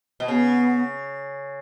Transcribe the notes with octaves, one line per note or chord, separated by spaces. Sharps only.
B2
C#3 B3